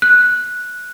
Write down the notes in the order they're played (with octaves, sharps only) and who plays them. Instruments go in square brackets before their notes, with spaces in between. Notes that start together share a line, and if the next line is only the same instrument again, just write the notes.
[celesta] F#6